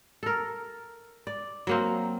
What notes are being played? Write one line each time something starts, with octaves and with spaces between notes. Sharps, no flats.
A4 A#4
D5
F#3 A#3 C4